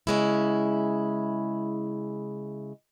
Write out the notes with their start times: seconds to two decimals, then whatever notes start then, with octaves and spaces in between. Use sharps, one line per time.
0.07 C#3 G#3 E4